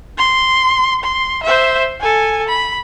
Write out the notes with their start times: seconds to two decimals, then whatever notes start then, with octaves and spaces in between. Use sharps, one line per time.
0.18 C6
1.04 C6
1.43 C5 E5
2.01 A4 G#5
2.49 B5